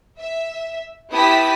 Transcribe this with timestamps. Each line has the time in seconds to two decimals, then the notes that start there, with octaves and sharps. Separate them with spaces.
0.21 E5
1.13 B3 E4 G4 A5 D#6 B6